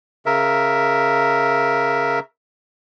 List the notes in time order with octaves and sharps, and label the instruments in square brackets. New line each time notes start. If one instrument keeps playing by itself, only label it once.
[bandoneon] C#3 A#4 E5